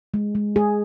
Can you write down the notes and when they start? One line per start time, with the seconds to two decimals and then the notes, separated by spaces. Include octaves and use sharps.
0.14 G#3
0.35 G#3
0.56 G#3 G#4